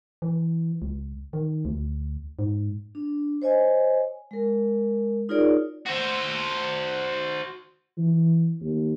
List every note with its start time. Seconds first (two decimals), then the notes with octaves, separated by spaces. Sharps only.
0.22 E3
0.82 C#2
1.33 D#3
1.65 D2
2.39 G#2
2.95 D4
3.42 C5 C#5 D#5 G#5
4.31 G#3 A#4
5.29 D#4 F4 G#4 A#4 C#5 D5
5.86 F#4 C5
7.98 E3
8.60 D#2